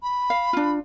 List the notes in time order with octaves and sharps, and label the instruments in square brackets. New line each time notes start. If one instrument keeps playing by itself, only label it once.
[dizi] B5
[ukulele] F5
D4 F4